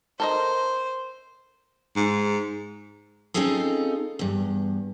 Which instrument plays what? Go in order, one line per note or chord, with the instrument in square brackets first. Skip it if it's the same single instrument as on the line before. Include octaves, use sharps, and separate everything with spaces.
[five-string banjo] A4 A#4 D#5 [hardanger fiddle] C5
[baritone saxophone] G#2
[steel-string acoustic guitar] C4 C#4 D#4 F4 G#4 A4
E2 G2